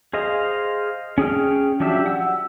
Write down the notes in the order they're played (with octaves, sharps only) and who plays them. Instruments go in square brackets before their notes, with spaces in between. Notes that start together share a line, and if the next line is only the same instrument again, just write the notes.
[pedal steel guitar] G#4 C5 D#5 F5
C#4 G#4 G5 F6
F3 F#3 D4 G4 E5
F#5 E6